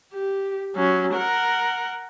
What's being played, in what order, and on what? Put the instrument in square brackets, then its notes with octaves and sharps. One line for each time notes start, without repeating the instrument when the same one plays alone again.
[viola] G4
F#3 C#4
A#4 F#5